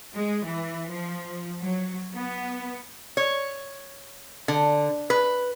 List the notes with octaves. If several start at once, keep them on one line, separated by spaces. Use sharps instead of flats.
G#3
E3
F3
F#3
B3
C#5
D3
B4